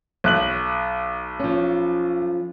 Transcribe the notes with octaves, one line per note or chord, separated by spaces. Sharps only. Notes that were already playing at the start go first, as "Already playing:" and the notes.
B1 F#6 F#7
F3 C#4